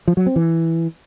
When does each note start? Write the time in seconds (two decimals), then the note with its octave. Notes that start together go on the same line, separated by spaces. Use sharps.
0.08 F3
0.17 F#3
0.26 C4
0.36 E3